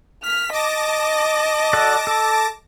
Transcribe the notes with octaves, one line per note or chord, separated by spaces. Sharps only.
F6 B6
D#5 A5 D6 A#6
F#4 A4 D5
A4